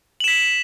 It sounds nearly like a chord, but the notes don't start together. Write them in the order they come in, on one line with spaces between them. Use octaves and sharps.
F#7 E7 B6